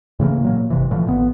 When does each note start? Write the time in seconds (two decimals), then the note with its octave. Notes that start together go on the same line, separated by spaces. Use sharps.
0.20 A2 C#3 E3 A#3
0.43 A#2 F#3 A#3
0.70 G1 C3 E3
0.91 A2 D3 E3 F3
1.08 A1 B3